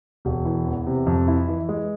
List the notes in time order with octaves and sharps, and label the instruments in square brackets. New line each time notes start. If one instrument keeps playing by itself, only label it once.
[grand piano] E1
E3
E2
C3
F2
E4
E3
G#3